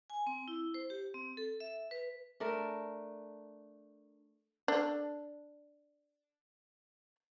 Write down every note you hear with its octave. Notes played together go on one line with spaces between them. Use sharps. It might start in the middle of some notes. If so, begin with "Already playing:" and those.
G#5
C4
E4
C5
G4
C4
A4
E5
B4
A3 D4 A#4
D4 A4